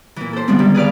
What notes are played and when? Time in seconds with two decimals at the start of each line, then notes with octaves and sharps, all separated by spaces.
0.16 A#2 E3
0.33 A4 C5
0.47 D3 F3 G3 G#3 B3 C4
0.59 D3 D#3 G3
0.74 G#4 B4 D5 F5